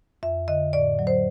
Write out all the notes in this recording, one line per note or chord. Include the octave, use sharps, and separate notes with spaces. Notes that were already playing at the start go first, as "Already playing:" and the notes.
F2 E5
D3 D#5
A2 D5
F#3
C5